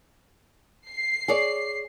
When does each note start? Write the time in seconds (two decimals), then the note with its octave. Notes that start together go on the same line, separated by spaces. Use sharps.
0.90 C7
1.28 G#4 C#5 D5